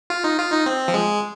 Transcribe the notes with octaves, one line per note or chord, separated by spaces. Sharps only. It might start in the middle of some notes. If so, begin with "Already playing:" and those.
F4
D#4
F4
D#4
C4
F3
G#3